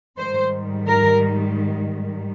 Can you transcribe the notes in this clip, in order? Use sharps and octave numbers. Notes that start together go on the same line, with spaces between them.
G#2 D#3 G3 C5
A#4